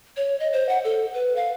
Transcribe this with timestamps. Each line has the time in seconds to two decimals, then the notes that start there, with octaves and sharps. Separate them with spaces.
0.17 C#5
0.40 D#5
0.53 C5
0.69 F#5
0.84 A4
1.14 B4
1.36 F5